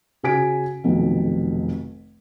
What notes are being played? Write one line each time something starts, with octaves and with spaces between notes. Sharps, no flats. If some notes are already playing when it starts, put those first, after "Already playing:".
C#3 F#4 G#5 B6 D7
F1 B1 F2 D#3